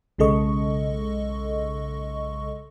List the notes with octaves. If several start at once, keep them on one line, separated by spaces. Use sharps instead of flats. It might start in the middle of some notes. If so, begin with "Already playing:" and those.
B1 C#3 G#3 A4 D#5 C#6